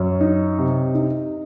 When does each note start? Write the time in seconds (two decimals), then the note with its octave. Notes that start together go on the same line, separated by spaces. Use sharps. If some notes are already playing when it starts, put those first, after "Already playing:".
Already playing: F#2
0.21 D#4
0.58 C3
0.94 D#4